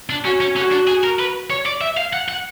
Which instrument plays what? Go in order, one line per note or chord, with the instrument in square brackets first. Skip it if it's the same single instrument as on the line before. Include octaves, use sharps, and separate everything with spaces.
[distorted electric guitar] D4
[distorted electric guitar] C#4 [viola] F#4
[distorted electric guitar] C#4
[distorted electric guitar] C#4 [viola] F#4
[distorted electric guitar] D4
G#4
A#4
B4
C#5
D5
E5
F5
F#5
F#5